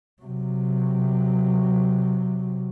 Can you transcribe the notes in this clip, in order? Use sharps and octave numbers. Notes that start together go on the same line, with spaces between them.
C3 F#3